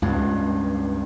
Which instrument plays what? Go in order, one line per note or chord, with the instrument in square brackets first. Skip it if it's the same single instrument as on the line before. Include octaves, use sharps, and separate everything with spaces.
[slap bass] C#2 G2